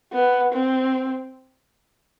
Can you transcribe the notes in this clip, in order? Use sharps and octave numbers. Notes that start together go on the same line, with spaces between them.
B3
C4